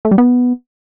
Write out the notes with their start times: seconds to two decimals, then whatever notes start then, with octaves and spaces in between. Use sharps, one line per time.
0.05 A3
0.11 G3
0.18 B3